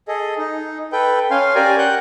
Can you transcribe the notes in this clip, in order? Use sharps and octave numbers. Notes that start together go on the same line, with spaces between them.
G#4 A4 D#5
D#4
A4 B4 G5
C#4 F5 G#5 C6
G4 A#4 D5 G#5
F#5 F#6 G6